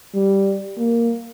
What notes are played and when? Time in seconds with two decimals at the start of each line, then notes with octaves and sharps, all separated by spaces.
0.15 G3
0.78 A#3